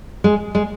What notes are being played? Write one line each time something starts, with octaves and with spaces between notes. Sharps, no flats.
G#3
G#3